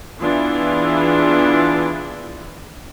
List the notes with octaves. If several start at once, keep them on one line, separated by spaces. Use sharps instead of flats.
E3 B3 D4 E4 F4 G#4